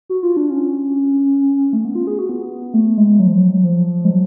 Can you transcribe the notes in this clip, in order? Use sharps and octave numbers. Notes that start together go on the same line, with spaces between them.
F#4
F4
D4
C#4
A3
B3
F4
G#4
F#4
B3
A3
G#3
F#3
F3
F#3
F3
G#3
F#3